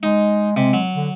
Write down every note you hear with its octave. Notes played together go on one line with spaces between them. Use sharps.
G#3 D#4
C3 G#3
F#3
D3